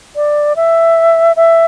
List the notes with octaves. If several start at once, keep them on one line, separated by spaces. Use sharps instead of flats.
D5
E5
E5